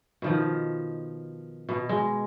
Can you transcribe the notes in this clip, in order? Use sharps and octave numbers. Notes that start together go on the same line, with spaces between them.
B2 D#3 F3
B2
G#3